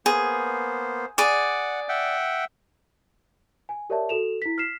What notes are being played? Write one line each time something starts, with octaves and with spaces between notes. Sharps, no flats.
A#3 B3 G#4 C5
G#4 D5 F#5 D6
E5 F#5 G5
G#5
G4 A#4 C#5 D5 E5 A5
F#4 A4 E7 F7
E4 B6
F6 B6 C7 E7